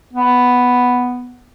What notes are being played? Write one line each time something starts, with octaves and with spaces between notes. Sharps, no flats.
B3